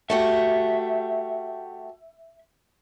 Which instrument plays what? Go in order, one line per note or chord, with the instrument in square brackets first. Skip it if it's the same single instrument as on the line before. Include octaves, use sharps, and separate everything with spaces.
[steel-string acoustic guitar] A3 F#4 G4 [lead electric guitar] E5